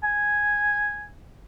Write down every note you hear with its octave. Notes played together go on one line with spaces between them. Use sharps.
G#5